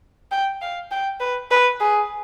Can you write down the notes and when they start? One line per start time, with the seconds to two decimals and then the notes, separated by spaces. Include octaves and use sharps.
0.32 G5
0.62 F5
0.91 G5
1.20 B4
1.51 B4
1.81 G#4